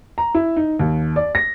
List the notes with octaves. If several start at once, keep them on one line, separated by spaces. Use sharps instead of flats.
A#5
E4
D#4
D#2
D5
A#6